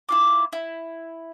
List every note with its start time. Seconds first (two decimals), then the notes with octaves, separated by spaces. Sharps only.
0.09 E4 F4 D6
0.53 E4